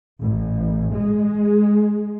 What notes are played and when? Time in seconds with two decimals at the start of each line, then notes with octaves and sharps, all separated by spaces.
0.21 A1
0.95 G#3